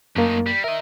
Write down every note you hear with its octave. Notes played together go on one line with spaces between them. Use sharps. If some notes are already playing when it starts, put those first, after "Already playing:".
F#2 A3 A#3 D#4
G3
A#4 D#5 E5